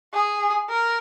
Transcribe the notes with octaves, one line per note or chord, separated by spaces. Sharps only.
G#4
A#4